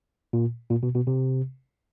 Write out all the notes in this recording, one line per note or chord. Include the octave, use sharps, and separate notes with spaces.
A#2
A#2
B2
B2
C3